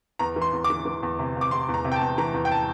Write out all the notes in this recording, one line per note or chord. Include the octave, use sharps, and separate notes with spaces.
E2 A#5
E3
C6
E2
D6
E3
E3
E2
C3
C3
D6
C3 C6
E2
A#5
C3
G5
A5
E2
E3 A#5
E2
G5
A5